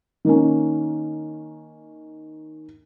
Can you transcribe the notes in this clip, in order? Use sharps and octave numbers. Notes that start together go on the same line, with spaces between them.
D#3 A#3 C#4